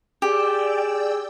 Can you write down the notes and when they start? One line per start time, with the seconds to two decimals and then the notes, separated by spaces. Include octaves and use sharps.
0.22 G4 G#4 D5 G5 E6